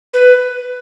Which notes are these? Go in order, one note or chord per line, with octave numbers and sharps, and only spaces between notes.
B4